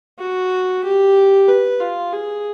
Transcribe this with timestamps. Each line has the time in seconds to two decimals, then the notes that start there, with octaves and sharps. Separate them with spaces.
0.19 F#4
0.84 G4
1.48 B4
1.80 F4
2.13 G#4